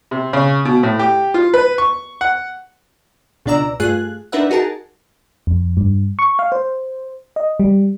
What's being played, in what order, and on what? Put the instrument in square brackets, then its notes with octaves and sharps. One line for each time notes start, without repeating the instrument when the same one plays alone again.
[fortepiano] C3
C#3
B2
A2
G4
F4
B4
C#6
F#5
[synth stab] C#2 B2 D4 D5 A#5 E6
G2 A3 F4 G#4 F#6
D4 D#4 A#4 B4 E5 F#5
D#4 F#4 G#4 A#4 A5
[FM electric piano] F2
G2
C#6
F5
C5
D#5
G3